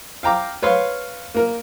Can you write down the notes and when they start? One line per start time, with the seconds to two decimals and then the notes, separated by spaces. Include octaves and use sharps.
0.23 F5 G5 A#5 D6
0.62 B4 C#5 F5 C6
1.35 A#3 A#4